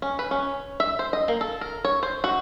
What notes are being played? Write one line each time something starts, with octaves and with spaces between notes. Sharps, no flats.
C#4
B4
C#4
E5
C5
D#5
A#3
A4
A#4
C#5
C5
F#4